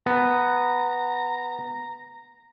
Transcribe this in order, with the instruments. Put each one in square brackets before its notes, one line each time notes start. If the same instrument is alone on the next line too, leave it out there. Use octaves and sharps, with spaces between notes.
[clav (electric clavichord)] B3 B4 [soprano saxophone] A#5